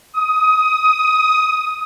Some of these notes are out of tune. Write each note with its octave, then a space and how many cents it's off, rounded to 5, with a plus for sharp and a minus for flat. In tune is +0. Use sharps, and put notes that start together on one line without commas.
D#6 +20